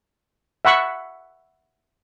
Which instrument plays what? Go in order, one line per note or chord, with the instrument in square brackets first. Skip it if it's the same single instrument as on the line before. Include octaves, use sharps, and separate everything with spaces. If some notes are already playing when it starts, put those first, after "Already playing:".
[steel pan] E5 F#5 B5 C#6